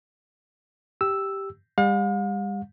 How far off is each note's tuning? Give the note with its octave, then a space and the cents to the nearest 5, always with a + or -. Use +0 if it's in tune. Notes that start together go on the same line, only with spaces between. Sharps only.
G4 +0 E6 +0
G3 +40 F5 +45